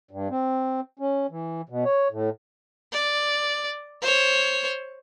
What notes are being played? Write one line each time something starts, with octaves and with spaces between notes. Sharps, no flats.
G2
C4
C#4
E3
B2
C#5
A2
D5
C5 C#5